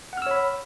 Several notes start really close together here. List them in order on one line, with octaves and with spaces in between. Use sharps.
F#5 F6 E6 C#5 B5